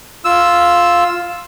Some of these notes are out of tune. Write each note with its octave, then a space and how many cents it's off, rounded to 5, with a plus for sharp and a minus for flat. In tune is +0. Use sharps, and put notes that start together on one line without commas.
F4 +0 E6 +0